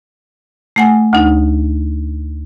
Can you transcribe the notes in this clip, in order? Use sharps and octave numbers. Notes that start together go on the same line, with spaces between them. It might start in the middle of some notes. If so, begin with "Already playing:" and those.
A3 F#5 G#5
D2 D#4